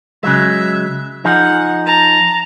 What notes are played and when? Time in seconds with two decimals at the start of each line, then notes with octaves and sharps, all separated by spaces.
0.23 C#3 F#3 G#3 E5
1.25 F3 D#4 G#4 F#5
1.86 A5 A#5